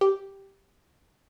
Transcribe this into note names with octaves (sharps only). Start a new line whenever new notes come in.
G4